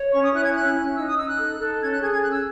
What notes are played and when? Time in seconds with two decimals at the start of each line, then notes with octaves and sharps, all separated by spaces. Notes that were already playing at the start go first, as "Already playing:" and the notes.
Already playing: C#5
0.12 C#4 C#6
0.22 D#6
0.33 E4 F#6
0.43 G#6
0.54 C#4 F#6
0.75 C#4
0.96 D#4 E6
1.06 D#6
1.17 D#4 E6
1.28 F#6
1.38 A4
1.59 A4
1.81 C#4 G#6
1.91 F#6
2.01 G#4 G#6
2.12 G#6
2.22 C#4 F#6
2.31 E6